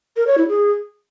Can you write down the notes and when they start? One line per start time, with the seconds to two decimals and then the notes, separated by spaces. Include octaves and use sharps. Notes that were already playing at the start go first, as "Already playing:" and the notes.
0.16 A#4
0.26 C#5
0.37 E4
0.48 G#4